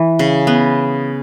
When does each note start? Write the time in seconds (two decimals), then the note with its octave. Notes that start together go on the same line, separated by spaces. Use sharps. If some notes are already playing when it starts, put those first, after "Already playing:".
Already playing: E3
0.19 C#3
0.47 B3